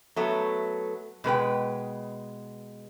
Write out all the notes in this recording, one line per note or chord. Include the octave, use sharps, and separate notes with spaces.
F#3 A3 B3
B2 G#3 B4 G5